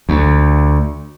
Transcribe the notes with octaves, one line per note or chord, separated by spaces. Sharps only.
D2